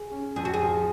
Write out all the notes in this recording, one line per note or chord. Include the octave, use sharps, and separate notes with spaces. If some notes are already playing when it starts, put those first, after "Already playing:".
Already playing: G#4
C#4
F2 G#4
F#4
G#4
F3